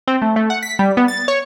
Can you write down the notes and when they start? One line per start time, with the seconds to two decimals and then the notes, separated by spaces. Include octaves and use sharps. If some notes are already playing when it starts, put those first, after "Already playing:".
0.08 C4
0.22 A3
0.36 A3
0.50 F#5
0.63 B6
0.79 G3
0.97 B3
1.08 A6
1.28 C#5